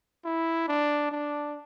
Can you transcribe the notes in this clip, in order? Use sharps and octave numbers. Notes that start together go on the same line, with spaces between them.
E4
D4
D4